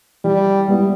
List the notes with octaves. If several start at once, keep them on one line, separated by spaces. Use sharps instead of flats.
E3 G3
G3 B3 E4